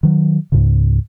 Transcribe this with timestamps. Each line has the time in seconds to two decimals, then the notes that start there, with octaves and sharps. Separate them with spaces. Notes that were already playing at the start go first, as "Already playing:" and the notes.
0.03 D#3 F#3
0.52 C#2 G#2 C#3